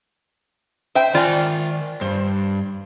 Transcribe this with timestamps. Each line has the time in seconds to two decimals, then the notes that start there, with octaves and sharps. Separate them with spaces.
0.95 C5 E5 G5
1.15 D#3 F4 D5 G#5
2.01 G2 C5